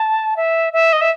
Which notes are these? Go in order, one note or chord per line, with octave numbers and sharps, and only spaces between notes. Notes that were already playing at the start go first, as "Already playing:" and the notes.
Already playing: A5
E5
E5
D#5
E5